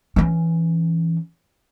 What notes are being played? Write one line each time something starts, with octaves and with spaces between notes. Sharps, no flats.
E3 C#4